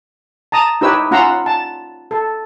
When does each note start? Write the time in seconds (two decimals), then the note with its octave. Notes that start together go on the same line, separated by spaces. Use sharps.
0.52 A5 A#5 D#6
0.81 D#4 E4 G4 B4 C#5 E6
1.11 C#4 F4 F#5 A#5 C6 E6
1.46 A5
2.11 A4